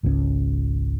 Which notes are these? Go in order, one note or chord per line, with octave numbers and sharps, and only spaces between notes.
G#1 C#2 D#3 C#4